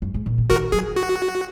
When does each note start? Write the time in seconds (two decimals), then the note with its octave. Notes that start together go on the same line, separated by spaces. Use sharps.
0.02 F#2
0.14 G#2
0.26 A#2
0.38 C#3
0.50 D#3 F#4 A#4
0.72 F#3 G#4
0.96 F#4